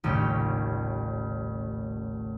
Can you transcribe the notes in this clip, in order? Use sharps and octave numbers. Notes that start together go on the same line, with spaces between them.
D#1 A1 C#3 G3 C#4 G5